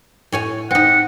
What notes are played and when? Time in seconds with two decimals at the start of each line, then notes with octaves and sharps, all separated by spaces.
0.32 A2 C#5 G#5
0.71 C4 D#4 F#5